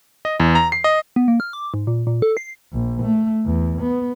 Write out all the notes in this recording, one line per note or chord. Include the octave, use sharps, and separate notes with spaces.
D#5
E2
A#5
C7
D#5
B3
A#3
F6
D6
G#2
A#2
A#2
A4
C7
A#1
A3
E2
B3